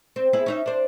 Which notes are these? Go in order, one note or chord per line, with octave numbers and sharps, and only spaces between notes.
C4
B3 E4 G#4
C#4 D#4 E5
D4 C5